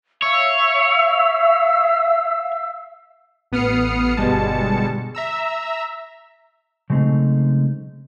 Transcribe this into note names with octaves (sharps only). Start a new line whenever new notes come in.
C#5 E5 F5 E6
A1 B3 D#6 F6 C7 C#7
G1 B2 G3 G#3 A5 C#7
E5 A#5 E6
C#3 F#3 G#3 A3 C4 D#4